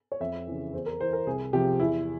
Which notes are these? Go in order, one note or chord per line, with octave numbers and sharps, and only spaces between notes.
C#5
F2 E5
C#3 E3
E2 C5
A#4
E3 C5
A#4
C2 G#4
C3 F3 G4
E2 E4